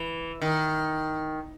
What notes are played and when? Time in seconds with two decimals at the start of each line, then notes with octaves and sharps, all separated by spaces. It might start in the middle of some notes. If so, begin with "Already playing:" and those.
Already playing: E3
0.42 D#3